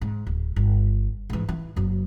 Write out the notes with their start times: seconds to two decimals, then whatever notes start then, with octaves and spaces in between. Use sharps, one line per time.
0.01 G#2
0.27 D1
0.56 G1
1.30 G#2 E3
1.49 E3
1.76 F#1 F#3